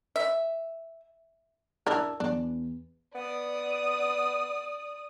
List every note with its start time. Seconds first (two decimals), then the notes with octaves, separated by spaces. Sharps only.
0.16 E5
1.87 D4 E4 A#4 A5 E6
2.20 E2 D4
3.15 B3 D5 D#6